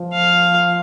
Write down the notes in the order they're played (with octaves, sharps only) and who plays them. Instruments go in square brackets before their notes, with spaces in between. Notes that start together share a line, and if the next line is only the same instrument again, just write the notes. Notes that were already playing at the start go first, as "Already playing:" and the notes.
Already playing: [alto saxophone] F3
[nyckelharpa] F5